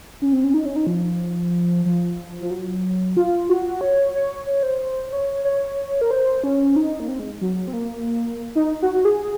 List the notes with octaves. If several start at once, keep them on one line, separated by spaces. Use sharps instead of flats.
C#4
C4
C#4
D#4
C#4
D#4
F3
F3
F3
F#3
F4
F#4
C#5
C#5
C#5
C5
C#5
C#5
A#4
C5
C#4
D#4
A#3
C4
G#3
F#3
C4
A#3
D#4
F#4
F#4
G#4